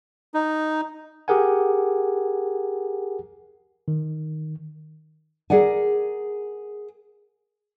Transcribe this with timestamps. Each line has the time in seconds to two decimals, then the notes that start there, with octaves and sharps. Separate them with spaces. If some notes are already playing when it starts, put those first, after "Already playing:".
0.34 D#4
1.28 G4 G#4 A#4 F#5 G#5
3.88 D#3
5.50 G#4 A#4 D5 F#5 G#5